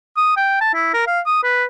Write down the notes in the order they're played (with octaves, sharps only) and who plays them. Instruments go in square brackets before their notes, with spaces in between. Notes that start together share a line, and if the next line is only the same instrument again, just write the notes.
[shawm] D#6
G5
A5
E4
A#4
F5
D#6
B4